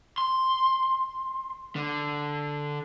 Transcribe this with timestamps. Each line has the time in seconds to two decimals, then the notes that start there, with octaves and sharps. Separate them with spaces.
0.18 C6
1.76 D3